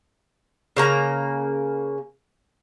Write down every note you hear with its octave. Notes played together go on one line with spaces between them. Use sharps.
C#3 A#3 A#5